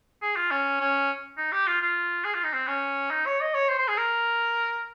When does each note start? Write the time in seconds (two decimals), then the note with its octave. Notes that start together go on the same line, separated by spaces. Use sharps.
0.22 G#4
0.36 F4
0.51 C#4
0.80 C#4
1.37 D#4
1.52 G4
1.67 F4
1.82 F4
2.25 G#4
2.34 F4
2.44 D#4
2.53 C4
2.68 C#4
3.11 D#4
3.26 C#5
3.41 D#5
3.54 C#5
3.69 C5
3.79 C5
3.88 G#4
3.98 A#4